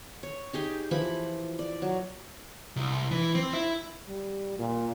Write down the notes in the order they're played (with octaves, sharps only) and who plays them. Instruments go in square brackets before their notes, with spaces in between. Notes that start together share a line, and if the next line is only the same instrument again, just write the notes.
[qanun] C#5
D#4 G4 G#4 G5
E3 F3 E4 B5
D5
F#3
[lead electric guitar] C2
E3
C4
E4
[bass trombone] G3
A#2